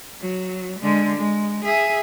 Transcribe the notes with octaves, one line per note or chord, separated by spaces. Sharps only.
F#3
D3 G#3
G#3
G#4 E5